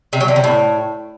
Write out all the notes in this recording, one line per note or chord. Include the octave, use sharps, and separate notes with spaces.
C3
F#3
D3
C3
A2